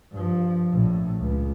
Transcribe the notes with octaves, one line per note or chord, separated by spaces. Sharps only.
G2 F3
A#1 A2
C#2